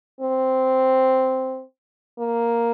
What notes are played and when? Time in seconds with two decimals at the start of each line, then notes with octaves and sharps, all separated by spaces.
0.21 C4
2.19 A#3